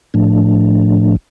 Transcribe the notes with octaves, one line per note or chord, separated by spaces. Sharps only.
A2 F3 A3 D4